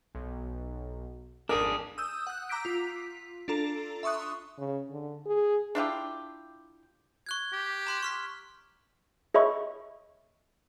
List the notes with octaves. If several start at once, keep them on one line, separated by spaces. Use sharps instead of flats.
B1
G#1 F2 D4 G#4 A#4 B6
D#6 E6 G6
F#5 F#6
A#5 D6 E6 G6 B6 D7
F4 B6
D4 F4 A4 A#5
E5 C6 C#6 D#6 F#6
C#3
D3
G#4
D4 E4 F4 G4
C#6 F#6 G#6
G4
A#5 C6 F#6
C#6 F6 B6
G#4 C#5 D#5 E5 B5 C#6